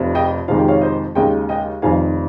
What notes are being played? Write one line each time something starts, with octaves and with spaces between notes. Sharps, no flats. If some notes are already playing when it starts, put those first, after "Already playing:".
Already playing: F1 F2 C3
D#5 G5
F2 C3 D#3 G#3 F5
G5
C#5 F5
C5 D#5
D#2 C#3 G#3 D#5 G5
D#5 G5
F1 F2 D#3 F5 G#5